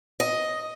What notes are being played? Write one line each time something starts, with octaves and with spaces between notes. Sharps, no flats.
D#5